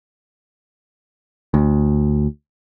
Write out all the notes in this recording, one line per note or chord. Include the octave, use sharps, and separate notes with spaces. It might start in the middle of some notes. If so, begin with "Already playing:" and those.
D2